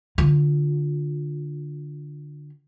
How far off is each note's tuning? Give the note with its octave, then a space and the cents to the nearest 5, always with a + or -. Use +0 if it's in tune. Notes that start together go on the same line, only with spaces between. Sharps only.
D3 +0 F4 +20